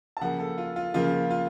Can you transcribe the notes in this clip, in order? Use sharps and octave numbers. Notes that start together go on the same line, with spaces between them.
A5
C#3 F3 A#3 F#5
A4
F4
F4
C#3 F3 A#3 F4
F4